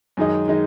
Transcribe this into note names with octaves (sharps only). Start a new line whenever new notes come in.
F#2 D#3 G#3 D#4
D#3 G#3 D#4